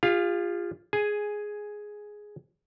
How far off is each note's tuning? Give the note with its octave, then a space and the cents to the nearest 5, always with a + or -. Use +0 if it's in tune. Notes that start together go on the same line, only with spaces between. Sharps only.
F4 +0 G#4 -45 F5 +0
G#4 +5 G#5 +0